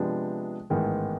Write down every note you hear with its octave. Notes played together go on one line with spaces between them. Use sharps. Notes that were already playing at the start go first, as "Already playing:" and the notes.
Already playing: C3 F3 G#3 B3 D4
A1 G#2 D#3 G#3 B3